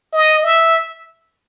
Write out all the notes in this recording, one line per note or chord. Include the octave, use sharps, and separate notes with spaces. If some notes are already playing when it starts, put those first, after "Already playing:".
D#5
E5